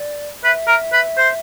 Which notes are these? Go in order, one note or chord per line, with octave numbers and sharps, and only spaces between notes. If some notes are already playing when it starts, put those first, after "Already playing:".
Already playing: D5
B4 E5
A#4
B4
C5